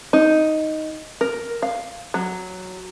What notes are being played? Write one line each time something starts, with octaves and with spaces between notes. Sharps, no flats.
D#4
A#4
F5
F#3